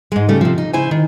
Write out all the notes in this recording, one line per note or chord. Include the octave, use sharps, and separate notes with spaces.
G#2 G#3
C#3 G3 A3
C3 F3
D#4
C#3 E4 C5 G#5
D#3